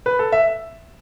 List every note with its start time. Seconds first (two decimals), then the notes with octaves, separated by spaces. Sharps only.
0.06 B4
0.19 A4
0.32 E5